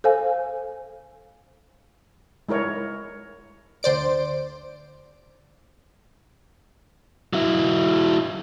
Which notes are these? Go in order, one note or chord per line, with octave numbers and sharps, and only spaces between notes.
A4 C5 F5 G#5
G#3 E4 A#4 C#5
D2 C5 D5 D7
F#3 E4